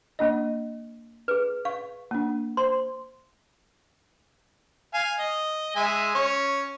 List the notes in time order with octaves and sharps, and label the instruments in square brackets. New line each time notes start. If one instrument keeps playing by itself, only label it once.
[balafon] A#3 D4 D#5
[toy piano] G#4 B4
[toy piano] F5 [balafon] C#6
[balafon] A#3 D4
[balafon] C5 [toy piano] C6
[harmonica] F5 G#5
D#5
G#3 E5 G#5
C#4